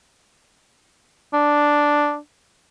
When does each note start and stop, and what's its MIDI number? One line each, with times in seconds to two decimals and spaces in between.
1.34 2.17 62